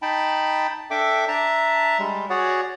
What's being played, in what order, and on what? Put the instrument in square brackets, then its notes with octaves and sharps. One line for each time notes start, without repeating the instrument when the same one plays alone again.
[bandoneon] D#4 G5 A5 B5
D4 A4 E5 G5 D6
D4 E5 A5 A#5
G3 G#3
F#4 G#4 C#5 D5 F#5